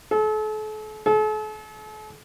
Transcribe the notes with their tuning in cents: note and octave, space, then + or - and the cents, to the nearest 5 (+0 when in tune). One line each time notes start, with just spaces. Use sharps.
A4 -40
A4 -45